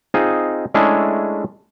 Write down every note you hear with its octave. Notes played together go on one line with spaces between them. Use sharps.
C4 D#4 F4 G#4 D#5
G#3 A3 C#4 D4 E4 G#4